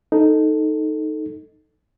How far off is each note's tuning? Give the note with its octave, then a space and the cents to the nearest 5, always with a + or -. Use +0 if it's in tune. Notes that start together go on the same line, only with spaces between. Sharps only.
D#4 +0 A4 +0